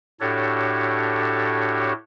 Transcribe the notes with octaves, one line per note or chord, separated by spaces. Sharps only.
A2 D4 F#4 G4 A4 C#5